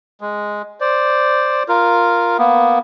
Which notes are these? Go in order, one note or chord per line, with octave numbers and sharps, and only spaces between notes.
G#3
C5 D5
F4 A#4
A#3 B3